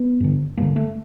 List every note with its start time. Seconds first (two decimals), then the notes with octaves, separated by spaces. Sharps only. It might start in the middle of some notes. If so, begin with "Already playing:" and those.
Already playing: B3
0.20 G2 D3
0.57 G2 D3 A#3
0.76 A3